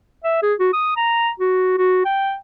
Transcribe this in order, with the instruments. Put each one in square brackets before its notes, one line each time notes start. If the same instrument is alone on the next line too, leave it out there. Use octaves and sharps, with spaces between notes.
[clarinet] E5
G#4
F#4
D#6
A#5
F#4
F#4
G5